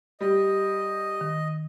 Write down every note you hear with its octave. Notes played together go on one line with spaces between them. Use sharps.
G3 D#5
D#3